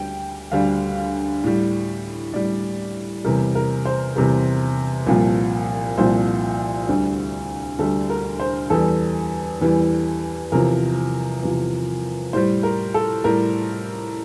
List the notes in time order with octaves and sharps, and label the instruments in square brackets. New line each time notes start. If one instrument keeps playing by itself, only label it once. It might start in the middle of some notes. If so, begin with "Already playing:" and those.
Already playing: [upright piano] D2 G3 G5
D2 D3 G3 F5
A2 G3
A2 G3 D5
E2 C3 G3 A#4
A#4
C5
E2 C3 G3 A#4
C2 A#2 F3
C2 A#2 F3 C5
D2 D3 G3
D2 D3 G3 A4
A#4
C5
E2 E3 G3 A4
E2 E3 G3
E2 C3 F3 A#4
E2 C3 F3
A2 G3 C5
A#4
A4
A2 G3 A#4